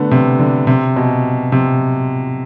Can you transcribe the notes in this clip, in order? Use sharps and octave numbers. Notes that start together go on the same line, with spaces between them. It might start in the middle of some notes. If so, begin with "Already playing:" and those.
Already playing: D3 A3 B3
C3
D3
C3
B2
C3